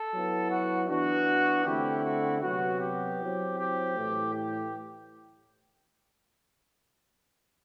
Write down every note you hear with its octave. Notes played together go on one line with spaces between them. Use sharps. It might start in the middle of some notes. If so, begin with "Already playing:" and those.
Already playing: A4
F#3 B3 E4
F#4
E3 B3 D4 F#4
D3 A3 C4 E4 G4
F#4
C3 F#3 B3 F#4
G4
F#3 C4 E4
G4
A2 E3 A3
G4